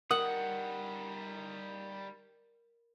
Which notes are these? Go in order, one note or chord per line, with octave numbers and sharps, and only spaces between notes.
G3 D#4 A#4 F#5 D#6